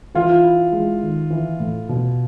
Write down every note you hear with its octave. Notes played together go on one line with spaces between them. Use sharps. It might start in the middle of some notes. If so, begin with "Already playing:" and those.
E3 F4
E4
G#3
D#3
E3
A2
B2